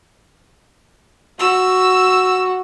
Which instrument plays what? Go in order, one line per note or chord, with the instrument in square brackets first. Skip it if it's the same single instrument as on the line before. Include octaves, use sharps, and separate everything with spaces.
[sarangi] F#4 [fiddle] E6